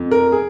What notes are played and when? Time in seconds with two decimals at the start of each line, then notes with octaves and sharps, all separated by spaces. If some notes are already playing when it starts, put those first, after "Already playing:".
Already playing: F2
0.11 A#4
0.32 G#4